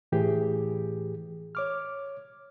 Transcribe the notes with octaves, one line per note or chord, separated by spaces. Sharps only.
A2 E3 G4 G#4
C#5 D6 F6